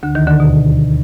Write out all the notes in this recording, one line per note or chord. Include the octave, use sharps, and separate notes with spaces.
D2 D3
D#2 D#3
D2 D3
B2